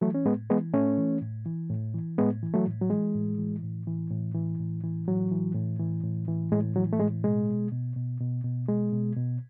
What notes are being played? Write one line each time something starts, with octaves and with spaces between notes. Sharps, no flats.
E3 F#3 A3
C#4
A2 G#3 B3
E3 G#3 B3
A2 A3 C#4
E3
A2
E3
A2
E3
A2 G#3 B3
E3
F#3 A3
A2
F#3
E3 G#3
A2
E3
A2
E3
A2
E3
A2
E3
A2 F#3
E3
A2
E3
A2
E3
A2 G#3
E3 F#3
A3
A2 G#3
B2 G#3
B2
B2
B2
B2
B2
B2 G#3
B2
B2